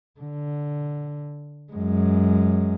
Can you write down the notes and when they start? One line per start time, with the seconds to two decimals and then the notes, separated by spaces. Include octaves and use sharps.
0.20 D3
1.73 F#2 G#3